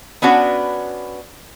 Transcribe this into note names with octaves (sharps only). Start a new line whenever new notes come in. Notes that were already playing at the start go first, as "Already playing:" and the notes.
B3 C#4 D4 F#4 B4